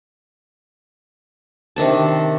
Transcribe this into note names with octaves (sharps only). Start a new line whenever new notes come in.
C3 D#3 D4 A5